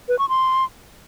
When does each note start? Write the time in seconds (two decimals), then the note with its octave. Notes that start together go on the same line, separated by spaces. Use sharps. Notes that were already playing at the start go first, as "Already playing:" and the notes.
0.09 B4
0.19 C#6
0.29 C6